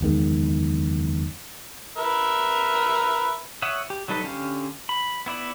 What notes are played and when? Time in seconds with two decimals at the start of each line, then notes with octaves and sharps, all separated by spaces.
0.01 F#1 E2 D#3 G#3
1.97 A#4 B4 E5
3.62 C#5 E5 F#5 D#6
3.90 G4
4.08 F#3 G3 D#4 A4 B4
4.23 D3 C#4 G4 F5
4.89 B5
5.26 B3 E4 D5